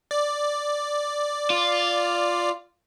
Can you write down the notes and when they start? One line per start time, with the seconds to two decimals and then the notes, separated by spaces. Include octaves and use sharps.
0.11 D5
1.50 F4